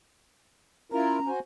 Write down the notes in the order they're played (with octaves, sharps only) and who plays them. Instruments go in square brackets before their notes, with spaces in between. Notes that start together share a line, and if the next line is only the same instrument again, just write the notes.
[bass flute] C#4 [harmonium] E4 F4 A#4 [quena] A#5
[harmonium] F#4 C5 G#5